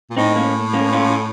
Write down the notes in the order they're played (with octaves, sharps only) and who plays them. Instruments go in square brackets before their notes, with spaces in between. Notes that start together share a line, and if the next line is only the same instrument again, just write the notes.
[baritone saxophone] A#2
[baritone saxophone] A2 [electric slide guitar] C4 D#4
[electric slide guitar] A#3 C#4
A#3 C#4
C#4 F4